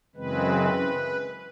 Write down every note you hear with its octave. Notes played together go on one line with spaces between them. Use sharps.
F#2 C#3 E3 G#3 C4 B4